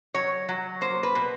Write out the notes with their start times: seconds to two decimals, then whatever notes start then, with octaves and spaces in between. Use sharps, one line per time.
0.14 F#3 C#5
0.49 F#3
0.81 A#3 C5
1.03 B4
1.15 B2